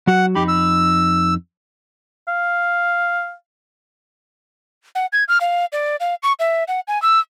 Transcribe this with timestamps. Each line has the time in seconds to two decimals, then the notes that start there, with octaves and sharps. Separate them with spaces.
0.07 F#3 F#4 F#5
0.35 F2 D#4 G4 B5
0.48 E6
2.28 F5
4.95 F#5
5.13 G#6
5.28 F6
5.40 F5
5.72 D5
6.00 F5
6.23 C#6
6.39 E5
6.68 F#5
6.88 G#5
7.02 E6